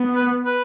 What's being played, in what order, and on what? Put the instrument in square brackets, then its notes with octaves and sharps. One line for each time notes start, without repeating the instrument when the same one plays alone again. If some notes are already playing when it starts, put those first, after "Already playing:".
Already playing: [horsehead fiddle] B3
[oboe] B4
B4